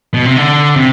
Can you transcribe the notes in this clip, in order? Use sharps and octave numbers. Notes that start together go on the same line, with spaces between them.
B2
C3
D3
C3